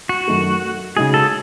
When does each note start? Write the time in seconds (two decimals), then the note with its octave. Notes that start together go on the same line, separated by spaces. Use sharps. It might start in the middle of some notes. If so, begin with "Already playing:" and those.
0.09 F#4
0.27 F#2 D#3 F#3 A3
0.96 C#3 G#3 D#4 F#4 G#4
1.14 A4